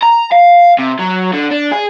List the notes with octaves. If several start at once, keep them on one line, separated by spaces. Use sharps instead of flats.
A#5
F5
C3
F#3
D3
D4
G#4